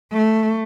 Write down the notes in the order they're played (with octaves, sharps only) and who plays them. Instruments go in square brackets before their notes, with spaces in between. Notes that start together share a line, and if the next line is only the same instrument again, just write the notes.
[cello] A3